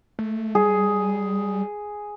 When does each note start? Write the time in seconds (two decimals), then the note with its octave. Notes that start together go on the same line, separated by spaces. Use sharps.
0.19 A3
0.55 G3 G#4